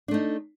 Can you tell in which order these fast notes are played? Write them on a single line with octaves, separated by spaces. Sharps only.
D4 A3 D#4